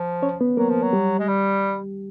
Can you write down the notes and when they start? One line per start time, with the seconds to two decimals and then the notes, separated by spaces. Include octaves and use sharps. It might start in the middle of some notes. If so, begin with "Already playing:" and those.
Already playing: F3
0.22 C#4 C#5
0.41 B3 B4
0.57 F#3 A#3 A#4
0.70 F3
0.83 F#3
0.93 G3 G4
1.19 G#3
1.28 G3